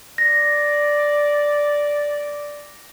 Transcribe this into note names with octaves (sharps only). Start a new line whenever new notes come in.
D5 A#6